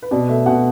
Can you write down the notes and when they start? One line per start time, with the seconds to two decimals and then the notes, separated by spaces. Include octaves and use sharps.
0.02 B4
0.11 B2 D5
0.29 A3 E5
0.46 B2 F#5